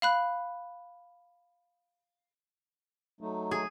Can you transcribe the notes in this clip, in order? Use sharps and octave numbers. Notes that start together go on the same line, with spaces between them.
F5 B5 F#6
F#3 A3 D#4
G#4